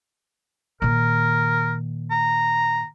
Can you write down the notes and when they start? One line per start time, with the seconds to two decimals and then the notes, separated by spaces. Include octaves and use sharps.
0.82 A#2 D#3 A#4
2.11 A#5